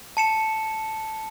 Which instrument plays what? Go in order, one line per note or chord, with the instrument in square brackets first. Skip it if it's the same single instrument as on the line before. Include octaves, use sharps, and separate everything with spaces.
[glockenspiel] A5 C#7 E7